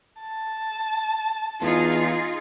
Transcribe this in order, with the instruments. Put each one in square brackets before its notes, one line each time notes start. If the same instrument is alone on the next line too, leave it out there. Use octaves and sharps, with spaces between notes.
[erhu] A5
[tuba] E2 [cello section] D#4 F4 G#4